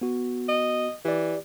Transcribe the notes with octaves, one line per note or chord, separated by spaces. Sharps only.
B3 F#4
D#5
E3 G4 D5